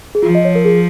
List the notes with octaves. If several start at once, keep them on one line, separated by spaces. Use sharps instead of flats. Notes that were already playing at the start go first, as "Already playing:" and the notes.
G#4
F3 F4
D#5
C#5
A#4
G#4